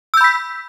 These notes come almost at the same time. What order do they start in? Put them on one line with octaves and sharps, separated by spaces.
E6 G6 B5 B6